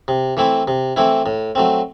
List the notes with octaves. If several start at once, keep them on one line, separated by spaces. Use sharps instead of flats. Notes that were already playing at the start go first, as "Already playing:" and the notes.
C3
E3 A3 C4 E4
C3
E3 A3 C4 E4
A2
F#3 A3 C4